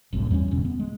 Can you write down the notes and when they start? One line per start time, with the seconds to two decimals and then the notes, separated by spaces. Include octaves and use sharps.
0.13 G1 C2 F#2 A2
0.31 E2 G3 A3 C#4
0.51 F1 E2 B2 D3
0.65 B3
0.79 G#3